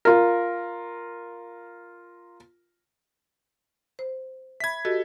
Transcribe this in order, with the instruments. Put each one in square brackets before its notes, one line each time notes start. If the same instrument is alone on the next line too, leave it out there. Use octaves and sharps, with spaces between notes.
[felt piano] F4 A#4
[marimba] C5
[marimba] E5 B5 [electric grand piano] G#6 B6
[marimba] F#4 G4 D#5 [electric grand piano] A4